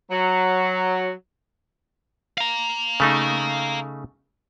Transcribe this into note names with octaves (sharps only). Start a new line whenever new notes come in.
F#3
F5 A#5
C#3 A3 D#4